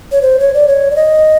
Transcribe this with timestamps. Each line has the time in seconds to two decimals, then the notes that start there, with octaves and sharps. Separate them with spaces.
0.12 C#5
0.22 C5
0.40 C#5
0.54 D5
0.68 C#5
0.91 D5
0.96 D#5